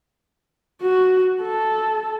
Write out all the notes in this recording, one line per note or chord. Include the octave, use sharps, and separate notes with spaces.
F#4
A4